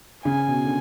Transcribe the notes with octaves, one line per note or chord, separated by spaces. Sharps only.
C#3 G#5
B2
D3